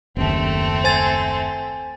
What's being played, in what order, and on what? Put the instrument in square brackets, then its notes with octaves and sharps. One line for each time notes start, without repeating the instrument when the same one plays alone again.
[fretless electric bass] F#1 D#2 [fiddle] A3 C4
[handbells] C5 G#5 A6